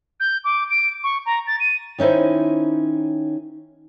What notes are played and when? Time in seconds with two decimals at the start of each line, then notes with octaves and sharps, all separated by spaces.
0.20 G6
0.44 D6
0.70 D7
1.03 C#6
1.26 A#5
1.47 A6
1.60 D#7
1.98 D#3 C#4 D#4 E4 C5